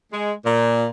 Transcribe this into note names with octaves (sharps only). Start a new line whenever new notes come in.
G#3
A#2